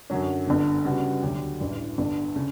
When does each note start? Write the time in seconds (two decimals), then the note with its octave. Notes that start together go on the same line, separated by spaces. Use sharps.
0.10 F#2 D3 F#3 C#4
0.47 G1 G2 D3
0.85 C#3 G3 B3 F#4
1.22 D2 D3 F#3 C#4 G4
1.60 A1 G2 E3
1.98 G1 G2 D3
2.36 C#3